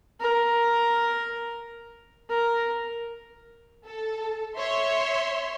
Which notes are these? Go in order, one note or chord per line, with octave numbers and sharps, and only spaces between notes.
A#4
A#4
A4
C#5 E5 C6 C#6